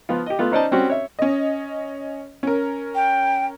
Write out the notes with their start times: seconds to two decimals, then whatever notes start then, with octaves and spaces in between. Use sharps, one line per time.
0.09 F3 B3 F4
0.26 G4 D#5
0.39 A3 B3 F4
0.51 C#4 D#4 C5 D5 D#5 A5
0.71 G3 C4 C#4 F#4
0.90 C#5 E5
1.19 C#4 D#5
2.43 C#4 A#4
2.95 G5